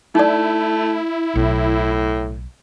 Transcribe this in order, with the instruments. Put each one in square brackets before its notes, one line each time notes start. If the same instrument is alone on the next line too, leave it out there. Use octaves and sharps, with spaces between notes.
[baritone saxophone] A3 [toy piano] D#4 D5 [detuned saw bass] E4
[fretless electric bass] B1 [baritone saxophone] A2